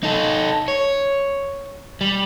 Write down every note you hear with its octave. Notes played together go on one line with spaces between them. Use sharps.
D#4 A4
C#5
G3